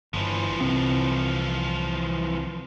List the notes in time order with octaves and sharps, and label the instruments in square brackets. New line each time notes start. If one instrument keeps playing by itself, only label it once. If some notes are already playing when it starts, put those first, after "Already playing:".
[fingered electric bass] G1 [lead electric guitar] E3 F3
[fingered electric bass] C2 C3 C4